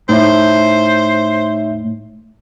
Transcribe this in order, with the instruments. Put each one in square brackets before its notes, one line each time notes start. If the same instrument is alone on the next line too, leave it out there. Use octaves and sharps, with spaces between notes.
[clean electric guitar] A2 [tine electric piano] D#4 C#5 E5 [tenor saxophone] C5